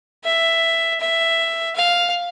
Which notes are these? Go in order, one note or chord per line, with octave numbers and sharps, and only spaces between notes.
E5
E5
F5